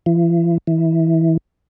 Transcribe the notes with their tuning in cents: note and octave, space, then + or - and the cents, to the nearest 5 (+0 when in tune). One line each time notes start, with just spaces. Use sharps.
E3 +45
E3 -15